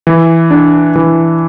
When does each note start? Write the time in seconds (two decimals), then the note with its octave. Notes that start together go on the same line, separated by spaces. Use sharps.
0.07 E3
0.51 D4
0.96 E3